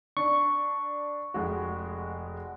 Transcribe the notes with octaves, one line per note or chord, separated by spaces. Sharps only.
D4 C#6
F1 G#3 F#4